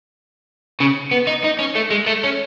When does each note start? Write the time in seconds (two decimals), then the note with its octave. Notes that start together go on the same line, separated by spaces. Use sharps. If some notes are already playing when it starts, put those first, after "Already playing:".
0.80 C#3
1.11 B3
1.27 D#4
1.44 D#4
1.59 C#4
1.75 A3
1.91 G#3
2.06 A3
2.23 C#4